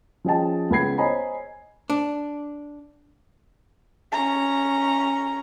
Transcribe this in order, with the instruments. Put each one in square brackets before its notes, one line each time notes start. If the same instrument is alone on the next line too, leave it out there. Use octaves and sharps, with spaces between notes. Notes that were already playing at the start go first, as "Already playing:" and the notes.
[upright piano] F3 C#4 G#4 D#5 G5 A5
C#2 B3 B5 G#6 C7
C5 C#5 D#5 G#5 A#5 B5
[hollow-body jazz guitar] D4
[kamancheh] C#4 A#5